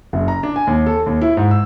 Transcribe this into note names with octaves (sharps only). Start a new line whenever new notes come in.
F#1
A#5
D4
G#5
D#2
A4
D#2
E4
G#2
E6